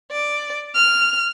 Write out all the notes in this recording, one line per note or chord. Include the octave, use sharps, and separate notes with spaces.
D5
F6